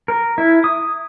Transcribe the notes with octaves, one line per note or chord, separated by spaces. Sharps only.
A#4
E4
D#6